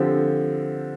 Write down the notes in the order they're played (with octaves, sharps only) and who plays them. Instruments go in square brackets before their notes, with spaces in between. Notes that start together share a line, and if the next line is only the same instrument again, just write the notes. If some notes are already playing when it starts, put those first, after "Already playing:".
Already playing: [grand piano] D3 F3 C4 G4